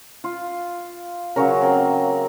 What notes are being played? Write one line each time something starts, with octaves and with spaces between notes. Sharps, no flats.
F4
C#3 F#3 A#4 C#5
A#3 C4